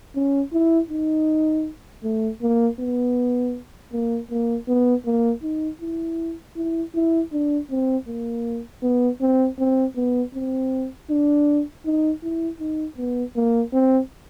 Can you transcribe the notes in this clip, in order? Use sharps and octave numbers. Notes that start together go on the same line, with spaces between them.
C#4
E4
D#4
A3
A#3
B3
A#3
A#3
B3
A#3
D#4
E4
E4
E4
D4
C4
A#3
B3
C4
C4
B3
C4
D4
D#4
E4
D#4
B3
A#3
C4